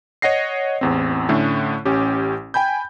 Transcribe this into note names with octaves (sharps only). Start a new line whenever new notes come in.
C#5 D#5 F#5 A#6 C7
A1 E2 C4
A2 D3 A3 C#4
A1 C#4 G4
G5 G#5 B5 G6